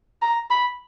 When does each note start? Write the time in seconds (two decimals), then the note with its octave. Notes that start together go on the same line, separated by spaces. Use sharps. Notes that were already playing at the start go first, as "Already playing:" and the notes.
0.22 A#5
0.50 B5